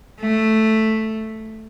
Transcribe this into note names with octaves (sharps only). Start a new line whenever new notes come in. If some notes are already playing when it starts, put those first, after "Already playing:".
A3